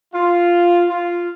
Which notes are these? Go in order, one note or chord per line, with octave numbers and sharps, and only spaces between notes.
F4
F4